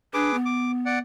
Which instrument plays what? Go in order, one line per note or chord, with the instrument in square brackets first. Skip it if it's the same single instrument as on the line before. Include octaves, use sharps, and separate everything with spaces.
[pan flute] D4 [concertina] G#4 B4 D6
[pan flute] B3
[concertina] D6
D5 F#5